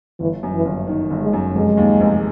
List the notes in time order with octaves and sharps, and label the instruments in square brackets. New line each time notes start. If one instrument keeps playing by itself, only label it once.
[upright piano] G1 [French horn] E3
[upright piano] F#2
[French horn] E3
[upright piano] G1
D#3
G1
[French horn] G#3
[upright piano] F#2
[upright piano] F1 [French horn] G#3
[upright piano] D#2
F1